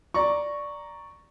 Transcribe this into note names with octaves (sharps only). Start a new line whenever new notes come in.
D5 A#5 C#6